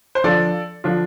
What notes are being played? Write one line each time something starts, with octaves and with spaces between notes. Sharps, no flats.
C5
D3 F3 D4 F4 A4 D5
D3 F3 D4 F4